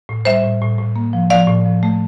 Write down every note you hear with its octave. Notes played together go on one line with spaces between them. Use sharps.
A2
G3 C5 E5
A2
A2
A2
A#3
F3
F3 D5 F5
A2
F3
A3